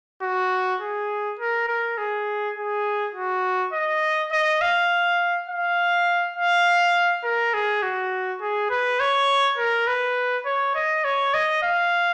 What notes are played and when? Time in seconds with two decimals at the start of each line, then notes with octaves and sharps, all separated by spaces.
0.22 F#4
0.81 G#4
1.39 A#4
1.68 A#4
1.98 G#4
2.56 G#4
3.15 F#4
3.73 D#5
4.32 D#5
4.61 F5
5.49 F5
6.36 F5
7.24 A#4
7.53 G#4
7.83 F#4
8.41 G#4
8.70 B4
9.00 C#5
9.58 A#4
9.87 B4
10.46 C#5
10.75 D#5
11.04 C#5
11.34 D#5
11.63 F5